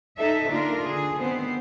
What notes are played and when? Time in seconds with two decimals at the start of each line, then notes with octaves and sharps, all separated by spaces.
0.17 D#4 A4 E5
0.50 D3 A#3 D4 F4 A#4
0.88 D3 G#4
1.22 D#3 B3 C4 C5